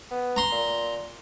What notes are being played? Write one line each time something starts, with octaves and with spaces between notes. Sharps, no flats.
B3
A#5 C6
A#2